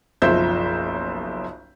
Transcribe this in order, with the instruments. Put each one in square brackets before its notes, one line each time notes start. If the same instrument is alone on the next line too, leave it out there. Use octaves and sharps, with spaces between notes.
[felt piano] F#1 B1 F3 C5 E5 G6